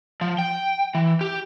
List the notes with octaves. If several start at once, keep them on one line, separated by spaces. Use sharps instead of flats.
F3
G5
E3
G4